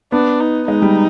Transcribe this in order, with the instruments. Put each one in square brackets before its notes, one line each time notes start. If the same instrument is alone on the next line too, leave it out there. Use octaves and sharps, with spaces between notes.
[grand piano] B3 [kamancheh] D4
[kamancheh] D#4
[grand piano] G#3 [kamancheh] D#4
[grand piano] G3